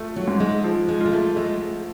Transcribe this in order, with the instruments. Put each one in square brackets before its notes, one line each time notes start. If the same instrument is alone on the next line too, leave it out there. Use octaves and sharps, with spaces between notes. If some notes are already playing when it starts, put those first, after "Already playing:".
Already playing: [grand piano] A3 F4
[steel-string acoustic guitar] F#3
[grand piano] G#2
[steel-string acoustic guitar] G#3
[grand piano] F3
[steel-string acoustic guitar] G#3
[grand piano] F4
[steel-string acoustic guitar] G#3
A3
[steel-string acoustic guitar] G#3 [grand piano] A3